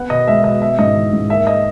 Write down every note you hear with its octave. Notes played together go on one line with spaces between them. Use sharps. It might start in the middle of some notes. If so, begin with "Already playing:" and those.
Already playing: B3 F#5
B2 D#5
G#3 E5
B2 D#5
B3 E5
G#2 D#5
E3
G#2
A#3 E5
D#5